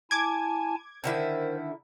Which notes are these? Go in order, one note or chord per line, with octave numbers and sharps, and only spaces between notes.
E4 G#5 A5 D6 G#6
D3 D#3 E4 A#4 C5